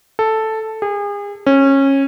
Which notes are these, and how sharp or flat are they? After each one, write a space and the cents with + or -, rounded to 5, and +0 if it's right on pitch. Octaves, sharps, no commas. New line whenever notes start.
A4 +0
G#4 -35
C#4 -20